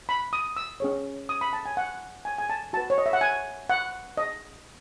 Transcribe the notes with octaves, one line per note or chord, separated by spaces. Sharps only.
B5
D#6
E6
C#4 G#4 C#5
D#6
B5
A5
G#5
F#5
G#5
G#5
A5
F#4 B4 A5
C#5
D#5
E5
F#5
G#5
F#5
D#5